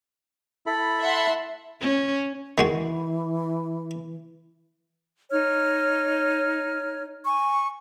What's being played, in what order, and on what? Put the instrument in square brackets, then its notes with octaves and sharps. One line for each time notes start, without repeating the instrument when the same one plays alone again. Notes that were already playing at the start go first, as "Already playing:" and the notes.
[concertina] E4 A4 B5
[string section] E5 F#5 C6
[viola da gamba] C#4
[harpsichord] D#3 G#3 F#4 [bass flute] E3
[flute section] D#4 C#5 F6
G#5 C#6